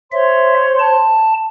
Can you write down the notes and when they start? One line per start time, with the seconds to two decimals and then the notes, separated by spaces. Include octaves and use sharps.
0.12 C5 C#5 E5 C6
0.79 A5